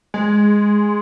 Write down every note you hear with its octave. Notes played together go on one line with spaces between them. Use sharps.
G#3